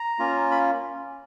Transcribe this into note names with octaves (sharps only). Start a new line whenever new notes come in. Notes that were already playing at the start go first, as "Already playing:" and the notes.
Already playing: A#5
A#3 C#4 F4
B5